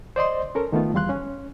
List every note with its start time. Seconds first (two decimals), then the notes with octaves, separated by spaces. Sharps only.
0.16 C5 D5 D#5 C6
0.55 C#4 A4 A#4
0.72 D#3 A3 B3 F4
0.94 E2 G3 F5 C6 F#6
1.09 C#4